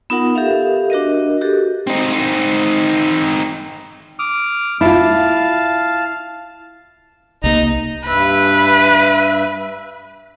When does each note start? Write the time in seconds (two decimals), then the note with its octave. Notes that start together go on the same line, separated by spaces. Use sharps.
0.10 B3 D#4 F4 A#4 F#5
0.35 G4 A4 A#4 E5 F5
0.90 D4 F#4 A#4 D#5
1.41 F#4 G4 A4
1.87 C4 D#4
4.19 D6 D#6 F6
4.81 E4 F4 F5 A5
7.44 C2 A#3 D#4 A#5
8.07 G2 B4 E5